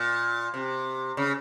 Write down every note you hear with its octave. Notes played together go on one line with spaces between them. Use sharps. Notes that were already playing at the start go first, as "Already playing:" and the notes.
Already playing: A#2
C3
C#3